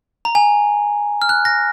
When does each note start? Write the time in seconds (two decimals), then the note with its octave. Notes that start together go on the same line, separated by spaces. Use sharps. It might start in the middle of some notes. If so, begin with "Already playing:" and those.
0.25 A#5
0.35 G#5
1.22 F6
1.29 F#6
1.45 A#6